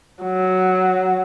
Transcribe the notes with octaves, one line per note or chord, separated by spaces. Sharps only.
F#3